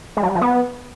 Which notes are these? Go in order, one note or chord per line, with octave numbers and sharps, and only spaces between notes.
G#3
F#3
G3
F3
B3